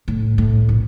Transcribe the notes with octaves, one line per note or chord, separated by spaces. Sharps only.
A2
A2
A#1